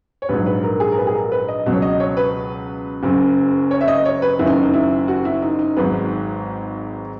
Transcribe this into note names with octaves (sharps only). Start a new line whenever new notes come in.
C#5
A#1 G#2 F#3 B4
B4
A#4
G#4
A#4
B4
G#4
A#4
B4
D#5
C#2 B2 F#3
C#5
D#5
C#5
B4
F#1 F#2 C#3
C#5
E5
D#5
C#5
B4
F#1 F#2 D#3 E4
D#4
D#4
E4
F#4
E4
D#4
D#4
G#1 G#2 F#3 B4